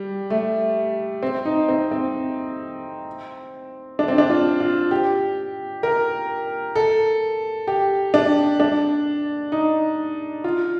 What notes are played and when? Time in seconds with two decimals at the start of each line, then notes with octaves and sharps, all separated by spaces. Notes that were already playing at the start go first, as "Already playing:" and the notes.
Already playing: G3
0.30 A3
1.23 C4
1.45 D#4
1.69 C4
1.91 C4
3.99 D4
4.08 C4
4.18 D4
4.30 F4
4.60 F4
4.91 G4
5.83 A#4
6.75 A4
7.67 G4
8.14 D4
8.60 D4
9.52 D#4
10.44 F4